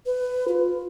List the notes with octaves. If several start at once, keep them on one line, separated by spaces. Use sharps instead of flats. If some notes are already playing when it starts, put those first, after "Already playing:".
B4
F4